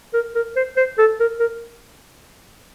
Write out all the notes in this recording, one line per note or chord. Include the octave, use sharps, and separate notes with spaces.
A#4
A#4
C5
C5
A4
A#4
A#4